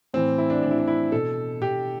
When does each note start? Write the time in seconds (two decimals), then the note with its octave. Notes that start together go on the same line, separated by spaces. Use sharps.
0.14 A2 E3 C4
0.38 E4
0.50 D4
0.62 A2 E3 D4
0.71 E4
0.78 D4
0.87 E4
1.12 B2 A4
1.61 B2 G4